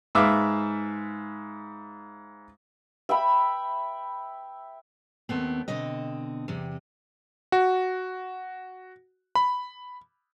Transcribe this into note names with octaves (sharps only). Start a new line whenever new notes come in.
G#2 B4 E5 F5 D6
E5 G5 B5
D#2 A3 B3 C4
B2 D3 C4 D#5
E2 C3
F#4
B5